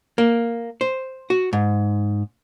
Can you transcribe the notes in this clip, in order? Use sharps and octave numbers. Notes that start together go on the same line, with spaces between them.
A#3
C5
F#4
G#2